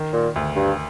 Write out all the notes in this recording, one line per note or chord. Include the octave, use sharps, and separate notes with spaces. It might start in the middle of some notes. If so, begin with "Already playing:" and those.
Already playing: D#3
A#2
D2
G2